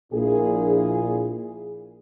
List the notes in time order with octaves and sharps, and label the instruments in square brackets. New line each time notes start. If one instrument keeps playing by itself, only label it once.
[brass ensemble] A#1 A#2 E4 G#4